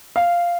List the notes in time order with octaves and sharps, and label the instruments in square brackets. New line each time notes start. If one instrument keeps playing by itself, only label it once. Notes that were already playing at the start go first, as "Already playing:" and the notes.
[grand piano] F5